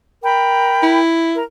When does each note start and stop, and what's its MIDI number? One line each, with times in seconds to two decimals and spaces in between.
0.23 0.98 70
0.23 0.98 79
0.23 0.98 83
0.83 1.41 64
1.34 1.43 70